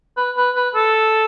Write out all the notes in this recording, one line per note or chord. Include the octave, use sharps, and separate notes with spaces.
B4
B4
B4
A4